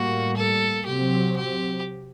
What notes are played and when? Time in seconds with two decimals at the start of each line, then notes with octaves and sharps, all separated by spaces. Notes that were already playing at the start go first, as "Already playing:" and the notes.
Already playing: A2 G3 A#3 F#4
0.36 A4
0.86 C3 F#3 C4 G4
1.36 G4